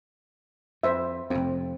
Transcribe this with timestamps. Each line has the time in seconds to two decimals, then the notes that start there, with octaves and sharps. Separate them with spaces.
0.83 F2 C5 E5
1.30 F1 F2 C4